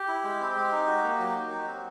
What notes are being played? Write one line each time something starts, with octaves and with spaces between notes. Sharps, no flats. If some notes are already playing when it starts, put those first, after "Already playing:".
Already playing: G4
E4
G#3
C4
G#3
D#4
F#4
A#3
F#3
D#4
F#4
C4